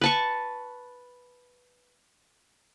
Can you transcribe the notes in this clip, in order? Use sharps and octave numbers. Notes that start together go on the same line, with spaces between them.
B4 A5 C#6